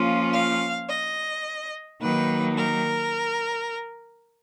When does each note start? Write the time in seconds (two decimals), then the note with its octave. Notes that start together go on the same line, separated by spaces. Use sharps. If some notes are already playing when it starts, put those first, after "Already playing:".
Already playing: F3 A#3 C#4 F4
0.32 F5
0.88 D#5
2.01 D#3 F#3 A#3 D#4 B4
2.56 A#4